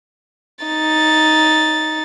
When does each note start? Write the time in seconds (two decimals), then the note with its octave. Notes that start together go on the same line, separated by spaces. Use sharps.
0.65 D#4 A6